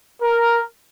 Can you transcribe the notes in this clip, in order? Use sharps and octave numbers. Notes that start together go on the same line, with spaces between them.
A#4